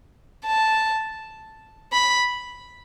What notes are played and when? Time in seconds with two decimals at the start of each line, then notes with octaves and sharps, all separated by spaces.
0.46 A5
1.92 B5